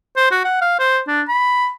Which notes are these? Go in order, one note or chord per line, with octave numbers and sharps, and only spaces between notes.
C5
F#4
F#5
F5
C5
D4
B5